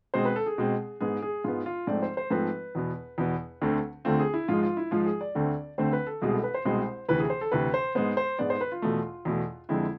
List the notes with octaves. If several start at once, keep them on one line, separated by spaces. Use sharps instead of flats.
B2 G#3 C4 C5
B4
A4
G#4
B2 G#3 C4
G#2 G#3 B3 G#4
G#4
G#2 G#3 B3 F4
F4
G#2 F3 A3 C4 D5
C5
C5
G#2 F3 A3 C4 B4
E2 B2 B3
E2 B2 B3
D2 D3 A3 C4
D2 D3 A3 C4 F4
G#4
E4
G#2 F3 G#3 F4
F4
E4
G#2 F3 G#3 F4
G#4
D5
D2 D3 A3 C4
D2 D3 A3 C4 C5
B4
A4
C2 B2 G#3 C4 G#4
A4
B4
C5
C2 B2 G#3 C4 C5
D2 C3 E3 B4
G#4
C5
A4
D2 C3 E3 B4
C5
G#2 G#3 B3 C5
C5
G#2 G#3 B3 D5
C5
B4
F4
E2 B2 A3
E2 B2 A3
F2 D3 G#3 C4 E4